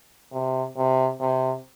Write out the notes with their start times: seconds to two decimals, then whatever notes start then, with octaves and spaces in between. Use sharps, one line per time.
0.31 C3
0.76 C3
1.20 C3